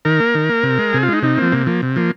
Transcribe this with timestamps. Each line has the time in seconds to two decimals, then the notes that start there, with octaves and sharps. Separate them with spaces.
0.05 D#3 A#4
0.20 A#3
0.35 D#3
0.49 A#3
0.63 C3
0.78 G#3
0.93 C3 G#4
1.03 F4
1.08 G#3 D#4
1.22 C3 D#4
1.37 F3 A#3 C4
1.52 C3 A#3
1.66 F3 A#3
1.82 C3
1.96 F3 A#3